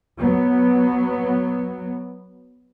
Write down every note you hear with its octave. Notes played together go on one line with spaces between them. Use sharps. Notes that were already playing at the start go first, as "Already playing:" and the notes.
F#3 B3